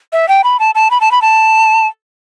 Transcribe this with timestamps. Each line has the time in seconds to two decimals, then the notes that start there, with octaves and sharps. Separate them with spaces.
0.13 E5
0.28 G5
0.44 B5
0.60 A5
0.75 A5
0.91 B5
1.01 A5
1.12 B5
1.22 A5